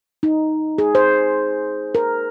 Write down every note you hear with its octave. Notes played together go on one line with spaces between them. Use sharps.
D#4
G#4
C5
A#4